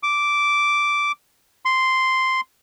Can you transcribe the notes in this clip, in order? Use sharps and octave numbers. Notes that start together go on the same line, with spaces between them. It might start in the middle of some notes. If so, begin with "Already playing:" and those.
D6
C6